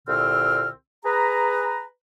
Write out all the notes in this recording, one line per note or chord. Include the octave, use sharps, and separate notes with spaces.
C2 A#2 D3 C4 E6 F6
G#4 B4 A#5